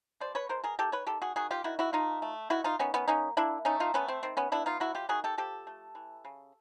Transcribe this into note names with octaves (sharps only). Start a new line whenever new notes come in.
B2 C5 D5
B4 C#5
B2 A#4 C5
G#4 A#4
D#3 G4 A4
B4 C#5
D#3 G4 A4
F#4 G#4
D#3 F#4 G#4
F4 G4
D#3 E4 F#4
E4 F#4
A3 D#4 F4
A3
D#3 E4 F#4
D#4 F4
D#3 B3 C#4
B3 C#4
A#3 C#4 D#4
A#3 D4 E4
A3 C#4 D#4
D#4 F4
A3 B3 C#4
C4
D#3 C4
B3 C#4
B3 D4 E4
D#4 F4
F#3 E4 F#4
F4 G4
D#3 F#4 G#4
G4 A4
F3 G4 A4
A3
E3
C#3